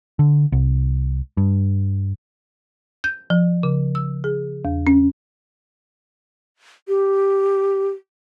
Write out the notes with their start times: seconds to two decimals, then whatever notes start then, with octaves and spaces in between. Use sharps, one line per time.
0.19 D3
0.52 C2
1.37 G2
3.04 G6
3.30 F3
3.63 C#3
3.95 E6
4.24 G#4
4.65 E2
4.87 C#4
6.88 G4